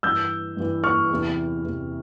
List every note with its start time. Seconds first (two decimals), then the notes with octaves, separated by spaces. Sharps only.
0.03 G2 E3 E6 G6
0.57 G2 E3
0.84 C#6 F6
1.10 E2 C3 E3
1.65 E2 C3 E3